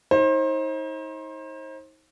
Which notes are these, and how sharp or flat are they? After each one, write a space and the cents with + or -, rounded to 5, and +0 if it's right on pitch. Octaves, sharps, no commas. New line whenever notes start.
D#4 +35 C5 +35